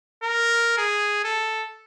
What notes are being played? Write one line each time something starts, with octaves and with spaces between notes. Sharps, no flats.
A#4
G#4
A4